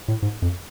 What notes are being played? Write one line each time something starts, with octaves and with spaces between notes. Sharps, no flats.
A2
G#2
F2